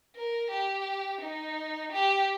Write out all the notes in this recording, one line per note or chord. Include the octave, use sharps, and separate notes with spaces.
A#4
G4
D#4
G4